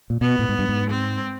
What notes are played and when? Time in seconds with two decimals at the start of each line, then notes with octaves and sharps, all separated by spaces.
0.10 A#2
0.21 B2 B3
0.39 A2
0.49 G#2
0.59 G2
0.69 G#2
0.90 C4